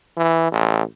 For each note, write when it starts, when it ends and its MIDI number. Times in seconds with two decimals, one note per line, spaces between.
0.17 0.50 52
0.52 0.82 33